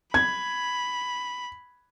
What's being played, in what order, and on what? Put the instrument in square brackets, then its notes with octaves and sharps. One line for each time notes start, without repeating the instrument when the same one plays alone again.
[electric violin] B5 [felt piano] G#6